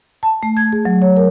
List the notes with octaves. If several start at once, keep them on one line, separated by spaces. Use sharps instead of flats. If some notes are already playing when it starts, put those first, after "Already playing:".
A5
A3
G#6
G#4
F#3
C#5
A#4